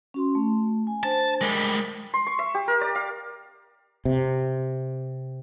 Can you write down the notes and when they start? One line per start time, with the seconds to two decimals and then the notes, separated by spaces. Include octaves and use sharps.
0.14 C#4 F#4 C6
0.35 A3
0.87 G#5
1.03 D4 C5 A5
1.41 G3 G#3 A#4
2.14 C6
2.27 C#6
2.39 E5
2.54 G4
2.68 A#4
2.81 D5
2.95 F5
4.05 C3